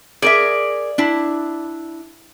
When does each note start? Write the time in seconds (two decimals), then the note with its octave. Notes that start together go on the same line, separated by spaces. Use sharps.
0.22 G#4 A#4 D5 E5
0.98 D4 E4